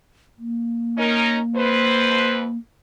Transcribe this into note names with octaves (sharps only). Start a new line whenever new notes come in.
A#3
C#4 D#4 A#4
F2 B4 C5